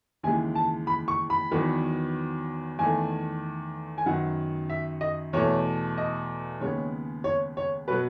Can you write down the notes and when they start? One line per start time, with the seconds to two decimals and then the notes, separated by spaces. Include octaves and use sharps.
0.23 D#2 C#3 E3 G#3 G#5
0.55 A5
0.87 B5
1.08 C#6
1.30 B5
1.51 E2 D#3 F#3 B3
2.78 E2 D#3 A3 G#5
3.98 G#5
4.06 F#2 D#3 F#3 B3 F#5
4.70 E5
5.01 D#5
5.33 E2 B2 A3 C#5
5.98 D#5
6.60 D#2 C#3 G#3 B3 C#5
7.24 C#5
7.57 C#5
7.88 B2 F#3 B3 B4